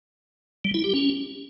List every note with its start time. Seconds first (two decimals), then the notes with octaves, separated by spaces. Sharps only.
0.65 G3
0.74 E4
0.84 G4
0.94 C#4